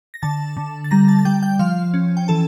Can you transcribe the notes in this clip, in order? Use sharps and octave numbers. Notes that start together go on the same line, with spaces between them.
A#6
D3 A5 A6
D3
A6
G3 A#5 A#6
A5 A6
A6
G3 G5 G6
G5 G6
F3 F5 F6
C#4
G5
E3 A4 A5